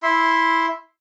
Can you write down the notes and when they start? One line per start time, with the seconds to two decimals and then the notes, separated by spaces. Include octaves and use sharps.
0.03 E4 E5 C6